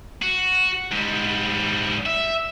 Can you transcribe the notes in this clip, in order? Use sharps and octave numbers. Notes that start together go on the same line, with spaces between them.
F#4
G#2 G3
E5